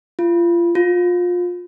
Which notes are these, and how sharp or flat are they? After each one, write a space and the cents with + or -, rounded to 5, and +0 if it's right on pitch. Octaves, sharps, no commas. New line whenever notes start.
F4 -30
F4 +25